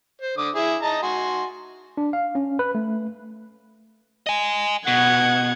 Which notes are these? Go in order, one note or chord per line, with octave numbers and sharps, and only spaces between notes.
C5
D3 D6 D#6
E4 G#4
D#5 A5 A#5
F#4 G#5 C6
D4
F5
C#4
B4
A3
D#5 G#5
B2 F#5 G#6